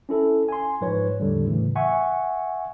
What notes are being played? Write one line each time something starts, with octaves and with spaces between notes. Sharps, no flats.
C#4 E4 A4
G#5 C6
G#2 F3 B4 C#5
E2 A2 D3 G3
A2 C#3 E3
E5 F#5 G#5 C#6